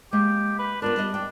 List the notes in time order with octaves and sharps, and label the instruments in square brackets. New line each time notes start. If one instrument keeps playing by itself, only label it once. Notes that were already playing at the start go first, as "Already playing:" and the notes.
[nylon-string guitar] G#3 A#3 D#5 [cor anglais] G4
[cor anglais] B4
[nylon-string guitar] B3 F4 A#4 [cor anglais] D4
[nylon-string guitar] G3 D#5
[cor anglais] D4 [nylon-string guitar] G5